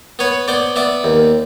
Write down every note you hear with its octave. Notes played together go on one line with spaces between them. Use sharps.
B3 B4 C#5
B3 C5 D5
B3 D5 E5
D#2